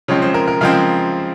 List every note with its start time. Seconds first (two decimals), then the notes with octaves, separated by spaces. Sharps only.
0.08 C#3 F3 G#3 C4 C#5
0.22 C5
0.34 A#4
0.48 A#4
0.61 C#3 F3 G#3 C4 F5